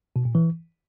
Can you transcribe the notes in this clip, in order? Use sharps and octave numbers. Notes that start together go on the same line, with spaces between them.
B2
A#2
E3